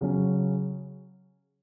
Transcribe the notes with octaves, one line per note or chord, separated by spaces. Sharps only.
C#3 F#3 C#4